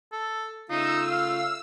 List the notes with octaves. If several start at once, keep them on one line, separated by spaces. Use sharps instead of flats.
A4
C#3 A3 D#4 F4 E6
F5